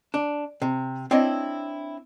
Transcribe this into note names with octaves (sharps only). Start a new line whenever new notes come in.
D4
C3
C4 D4 E4 C#5 D#5